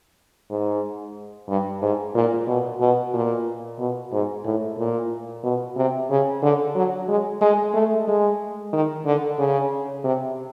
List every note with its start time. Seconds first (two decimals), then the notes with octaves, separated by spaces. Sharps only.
0.50 G#2
1.49 G2
1.82 G#2
2.15 A#2
2.47 B2
2.81 B2
3.14 A#2
3.79 B2
4.12 G#2
4.45 A2
4.78 A#2
5.44 B2
5.77 C3
6.10 C#3
6.43 D3
6.75 F#3
7.09 G#3
7.41 G#3
7.74 A3
8.08 G#3
8.73 D#3
9.06 D3
9.39 C#3
10.04 C3